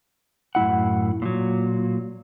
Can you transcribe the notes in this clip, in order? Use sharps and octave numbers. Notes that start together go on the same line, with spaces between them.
F#2 A2 E4 F#5
A#2 F#3